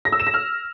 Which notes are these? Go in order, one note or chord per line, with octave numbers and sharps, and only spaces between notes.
A#6
E6
E7
A#6
F6